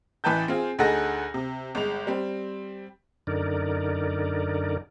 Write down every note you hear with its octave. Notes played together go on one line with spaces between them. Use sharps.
A1 E3 B4 G5 A5 G6
C4 F4 G#4
D2 D#4 G#4 A4 F#5 A#6
C3
G1 G#3 F7
G3 C4
F#2 D3 D#4 A#4 D5